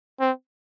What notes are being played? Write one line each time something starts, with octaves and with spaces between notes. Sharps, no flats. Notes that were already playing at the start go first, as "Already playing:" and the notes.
C4